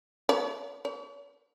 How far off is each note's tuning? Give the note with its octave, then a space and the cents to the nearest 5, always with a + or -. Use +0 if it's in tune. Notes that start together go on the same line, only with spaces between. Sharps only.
C#5 +45
C#5 +45